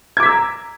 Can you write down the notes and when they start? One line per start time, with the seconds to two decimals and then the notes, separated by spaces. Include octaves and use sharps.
0.17 G#6
0.20 D6
0.23 B6
0.26 E6
0.29 A#5